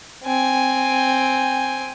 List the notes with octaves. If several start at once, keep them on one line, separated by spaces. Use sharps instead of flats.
C4 G#5